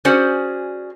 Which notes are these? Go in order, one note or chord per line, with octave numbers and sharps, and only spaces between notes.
C#4 F#4 G#4 C5 D5